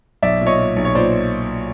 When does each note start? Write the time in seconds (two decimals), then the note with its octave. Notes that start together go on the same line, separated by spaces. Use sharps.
0.23 B1 D5 E5
0.41 A#2
0.46 C#5 D#5
0.59 A#2
0.76 B1
0.85 C#5
0.95 A#2 C5 D5